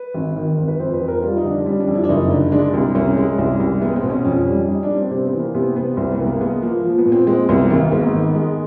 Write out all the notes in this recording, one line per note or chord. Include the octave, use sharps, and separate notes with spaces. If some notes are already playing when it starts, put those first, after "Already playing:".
Already playing: B4
G#1
D#3
G#1
B4
F2 C5
B4
F2
A#4
G3 F4
D#4
D3
D4
G3 C#4
D4
F2
E4
D4
F#1 D#4
D3
G#3 D4
C2
C2 C#4
G#3
C2
C2
G#3 B3
C4
B2
C#4
F2 C#4
G3
G3 D#4
D4
G3
C4
C3 C4
B3
E3
A#3
C3 B3
C3 B3
C2 C4
B3
C2
A#3
G#3 B3
F3 A#3
F3
B3
A#2
C4
G#3 C4
C2 B3
G#1 A#3
G#2 B3
D#3
G#3